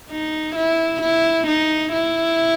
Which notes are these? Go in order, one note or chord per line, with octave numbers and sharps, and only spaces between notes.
D#4
E4
E4
D#4
E4